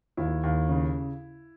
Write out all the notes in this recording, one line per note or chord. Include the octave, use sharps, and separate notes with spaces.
D#2 E4
D#2
C#3